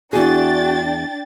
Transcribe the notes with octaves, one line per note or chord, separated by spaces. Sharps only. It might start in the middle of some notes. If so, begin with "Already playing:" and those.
E2 D4 F#4 G#4 G5 A6